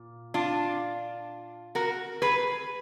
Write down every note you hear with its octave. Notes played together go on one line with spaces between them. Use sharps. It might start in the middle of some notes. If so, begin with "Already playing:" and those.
Already playing: A#2
D4 F4
F#4 A#4
G#4 B4